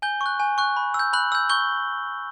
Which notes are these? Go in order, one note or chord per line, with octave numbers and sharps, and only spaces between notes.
G#5 G6 G7
C#6
F#6
G#5
C#6 F#6
B5
E6
G6
B5 F#6 F#7
E6 G6
C#6 G6 G7